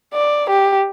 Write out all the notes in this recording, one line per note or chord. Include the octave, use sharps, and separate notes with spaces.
D5
G4